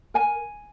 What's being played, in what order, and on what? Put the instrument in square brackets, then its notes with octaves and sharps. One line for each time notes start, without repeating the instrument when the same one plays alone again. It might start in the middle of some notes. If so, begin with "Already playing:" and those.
[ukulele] A#4 G#5